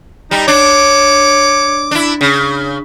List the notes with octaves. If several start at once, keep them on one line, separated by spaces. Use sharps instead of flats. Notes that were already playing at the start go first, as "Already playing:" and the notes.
G3 D#4
D4 C#5 D6
D4 E4
C#3